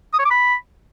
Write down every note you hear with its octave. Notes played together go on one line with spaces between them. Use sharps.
D#6
C#5
D6
B5